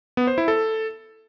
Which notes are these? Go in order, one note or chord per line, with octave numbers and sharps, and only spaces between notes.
B3
C5
E4
A4